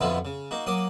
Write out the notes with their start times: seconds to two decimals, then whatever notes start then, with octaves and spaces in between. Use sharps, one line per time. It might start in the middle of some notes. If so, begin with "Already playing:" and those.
0.01 F2 B2 D3 B3 E4 F4
0.25 C#3
0.51 A#3 D#4 F#4
0.66 F#3 A#3 D6 D#6